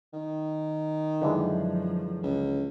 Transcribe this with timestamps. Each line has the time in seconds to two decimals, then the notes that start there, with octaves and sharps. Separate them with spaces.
0.13 D#3
1.22 F#2 D3 E3 F3 G#3
2.23 C#2